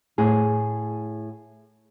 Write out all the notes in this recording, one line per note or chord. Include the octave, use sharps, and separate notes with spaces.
A2 G#4